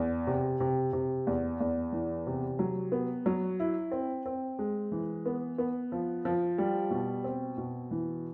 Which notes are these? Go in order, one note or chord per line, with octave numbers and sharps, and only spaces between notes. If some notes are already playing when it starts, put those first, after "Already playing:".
Already playing: E2
C3
C3
C3
E2
E2
E3
C3
F#3
B3
F#3
E4
C4
C4
G#3
E3
B3
B3
F3
F3
G3
B2
C4
B2
E3